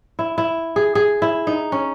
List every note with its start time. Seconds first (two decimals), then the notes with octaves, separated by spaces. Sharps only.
0.19 E4
0.38 E4
0.76 G#4
0.95 G#4
1.22 E4
1.47 D#4
1.72 C#4